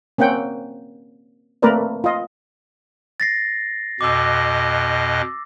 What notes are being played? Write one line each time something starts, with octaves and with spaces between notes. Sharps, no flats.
A#3 C4 C#4 F#5 G5
A3 A#3 C4 A#4 B4 D5
F4 D#5
A6 A#6 C7
F2 B2 D#5 D6 E6